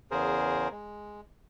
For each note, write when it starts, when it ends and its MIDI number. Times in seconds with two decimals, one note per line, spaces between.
0.11 0.68 40
0.11 0.68 49
0.11 0.68 68
0.11 0.68 70
0.11 0.68 72
0.72 1.21 56